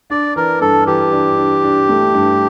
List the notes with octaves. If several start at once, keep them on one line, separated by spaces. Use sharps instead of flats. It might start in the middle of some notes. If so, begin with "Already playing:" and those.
D4 D5
E3 A#4
G2 A4
E3 G4
D4
D4
D4
A3
G2